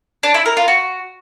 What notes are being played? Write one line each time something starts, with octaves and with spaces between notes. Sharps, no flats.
D4
E4
A#4
F4
F#4